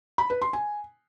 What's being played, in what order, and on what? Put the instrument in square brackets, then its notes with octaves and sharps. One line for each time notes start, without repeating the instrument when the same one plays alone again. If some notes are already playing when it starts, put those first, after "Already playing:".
[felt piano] B5
B4
C6
G#5